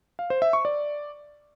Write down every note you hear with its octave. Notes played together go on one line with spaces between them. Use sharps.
F5
C5
E5
C#6
D5